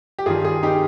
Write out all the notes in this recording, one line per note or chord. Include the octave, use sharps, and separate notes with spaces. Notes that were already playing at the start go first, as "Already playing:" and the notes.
G4
G2 D#3 G3 F4 G#4
F4 G#4
D#4 G4